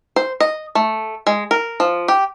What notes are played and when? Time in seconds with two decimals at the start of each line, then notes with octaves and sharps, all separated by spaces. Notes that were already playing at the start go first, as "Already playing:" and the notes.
0.16 C5
0.40 D#5
0.75 A3
1.27 G#3
1.51 A#4
1.80 F3
2.08 G4